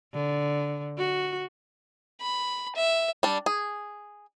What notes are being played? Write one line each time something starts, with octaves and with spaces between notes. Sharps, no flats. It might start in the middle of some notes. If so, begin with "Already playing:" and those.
D3
F#4
B5
E5
G3 D4
G#4